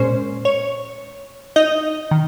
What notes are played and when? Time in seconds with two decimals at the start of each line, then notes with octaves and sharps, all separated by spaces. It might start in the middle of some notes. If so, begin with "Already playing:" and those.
Already playing: A#2 G#3 C#4 C5
0.45 C#5
1.56 D#4 D#5
2.11 D#3